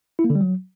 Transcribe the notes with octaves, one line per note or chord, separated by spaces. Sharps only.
E4
A#3
D3
G3
F#3